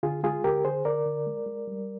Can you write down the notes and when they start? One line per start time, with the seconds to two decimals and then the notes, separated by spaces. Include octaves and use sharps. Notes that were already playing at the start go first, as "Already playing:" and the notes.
0.03 D3 F4 G#4
0.23 G#3 F4 G#4
0.44 D3 G4 A#4
0.65 D3 G#4 C5
0.85 D3 A#4 D5
1.06 D3
1.27 G#3
1.46 G#3
1.68 G3